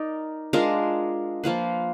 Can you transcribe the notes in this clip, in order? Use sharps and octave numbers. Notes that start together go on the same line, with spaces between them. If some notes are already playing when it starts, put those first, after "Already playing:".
Already playing: D#4 A#4 D5
G#3 D4 F4 A#4
F3 A#3 F4 B4